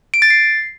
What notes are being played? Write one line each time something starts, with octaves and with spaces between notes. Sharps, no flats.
D7
A6
C7